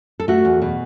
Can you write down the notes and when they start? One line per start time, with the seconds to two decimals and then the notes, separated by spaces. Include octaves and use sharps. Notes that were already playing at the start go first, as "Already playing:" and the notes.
0.20 A4
0.28 A3 F#4
0.45 E2
0.62 B2